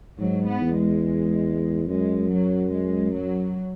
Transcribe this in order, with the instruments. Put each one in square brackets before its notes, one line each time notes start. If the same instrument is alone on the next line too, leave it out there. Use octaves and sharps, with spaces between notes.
[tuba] G#2 [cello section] F#3
[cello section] B3
[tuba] E2
[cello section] G#3
[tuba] F#2 [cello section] G#3
[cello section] F#3
G#3
F#3